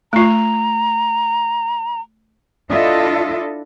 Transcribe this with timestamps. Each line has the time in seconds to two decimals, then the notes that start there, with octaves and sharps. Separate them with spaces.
0.13 A3 F4 A#5
2.70 D4 E4 F4 A4 D#5 E5